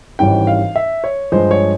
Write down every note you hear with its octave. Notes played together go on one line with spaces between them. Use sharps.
G#1 G#2 E3 G3 C#4 G5
F5
E5
C#5
G2 F3 G#3 C5
C#5